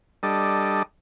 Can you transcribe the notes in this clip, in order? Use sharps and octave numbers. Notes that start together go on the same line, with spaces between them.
G3 D4 A4 D#5